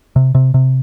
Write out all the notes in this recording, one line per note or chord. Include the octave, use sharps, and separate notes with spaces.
C3
C3
C3